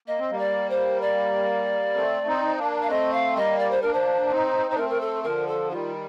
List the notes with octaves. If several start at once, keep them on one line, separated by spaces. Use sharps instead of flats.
A#3 D#5
C4
G3 A#3
D5
C5
D5
A3 C4
C4 D#4
A#3 D4
F5
A3 C4 D#5
F5
G3 A#3 D#5
D5
C5
A#3 D4 A#4
C5
C4 D#4
D4 C5
A3 C4 A#4
A#4
A4
D3 F3 A#4
A4
D#3 G3 F4